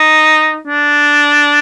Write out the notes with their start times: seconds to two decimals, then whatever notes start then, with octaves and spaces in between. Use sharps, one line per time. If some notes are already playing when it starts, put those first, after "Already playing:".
Already playing: D#4
0.67 D4